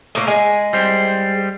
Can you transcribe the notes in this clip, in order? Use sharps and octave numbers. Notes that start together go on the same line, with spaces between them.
A2 A#3
G#3 G#5
G3 C5